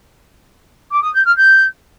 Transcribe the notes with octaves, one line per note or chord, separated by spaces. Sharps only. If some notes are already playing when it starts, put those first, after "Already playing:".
D6
D#6
G6
F6
G6